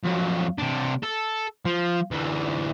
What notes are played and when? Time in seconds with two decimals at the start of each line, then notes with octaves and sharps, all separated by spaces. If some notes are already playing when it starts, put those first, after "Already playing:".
0.04 F2 F#3
0.59 C3 D4
1.03 A4
1.65 F3
2.11 D2 E3